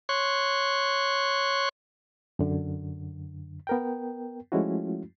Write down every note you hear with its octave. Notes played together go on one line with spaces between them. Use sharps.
C#5 C6 C#6 F#6
F#2 D3
B3 A#4 G5
F3 G#3 A3 C#4 E4 F#4